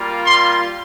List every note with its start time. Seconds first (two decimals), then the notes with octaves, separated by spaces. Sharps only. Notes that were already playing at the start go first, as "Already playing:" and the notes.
Already playing: G3 A#3 F4
0.25 C6